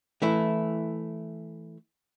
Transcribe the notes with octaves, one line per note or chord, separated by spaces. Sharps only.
E3 A3 E4